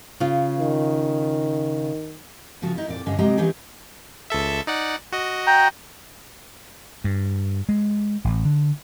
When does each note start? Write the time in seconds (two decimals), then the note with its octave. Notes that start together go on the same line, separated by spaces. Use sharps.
0.20 C#3 F4
0.58 D#3
2.62 C#3 F3 F4 F#4
2.75 D#4 E4
2.88 F2 A#2 D5
3.06 G2 D3 C#4 D#5 F5
3.18 C3 F#3 G#3 G4 D#5 A#5
3.37 E3 A#3 C#4 D#4 G4 G#4
4.30 C#2 A4 E5
4.67 D#4 D5 F#5
5.12 F#4 D#5
5.47 G5 A#5
7.04 G2
7.69 G#3
8.25 A1
8.45 D3